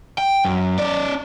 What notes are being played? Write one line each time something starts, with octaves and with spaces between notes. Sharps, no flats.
G5
F#2
C#4 D5